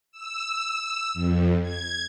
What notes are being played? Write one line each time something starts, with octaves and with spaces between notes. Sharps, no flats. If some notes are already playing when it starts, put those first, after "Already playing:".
E6
F2
G#6